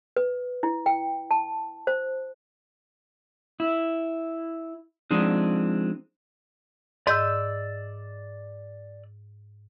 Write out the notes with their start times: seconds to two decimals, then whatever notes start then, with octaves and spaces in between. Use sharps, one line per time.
0.17 B4
0.63 E4
0.86 G5
1.31 A5
1.87 C5
3.60 E4
5.11 F3 G#3 C4 D4 D#4
7.07 G#2 D5 D#5 E6 G6